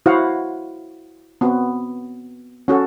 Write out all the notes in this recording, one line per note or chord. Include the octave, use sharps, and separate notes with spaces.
E4 F#4 C5 F5 F#5
B3 C4 F#4
C#4 F#4 A4